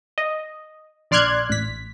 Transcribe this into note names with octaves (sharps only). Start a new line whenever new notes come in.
D#5
A#1 D5 C6 F6 F#6 G#6
A1 B6